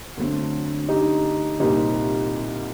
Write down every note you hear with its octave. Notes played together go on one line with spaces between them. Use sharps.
D2 D3 F#3 A3 C4
D#4 G4
C2 A#2 G3 C4 D#4 G4